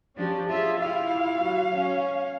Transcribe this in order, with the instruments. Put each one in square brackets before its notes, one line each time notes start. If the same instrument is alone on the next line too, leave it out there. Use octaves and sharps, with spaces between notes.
[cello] F3 D4 [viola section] C#4 G4
[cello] F4 [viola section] G#4 E5
[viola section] E4 F4 G4 [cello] F5
[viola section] F#3
C#4